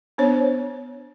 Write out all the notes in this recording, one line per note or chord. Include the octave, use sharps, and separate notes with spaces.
B3 D4 C5 C#5